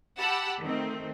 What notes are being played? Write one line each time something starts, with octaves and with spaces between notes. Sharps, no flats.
G4 F#5 A5 B5 E6
D#3 A3 C4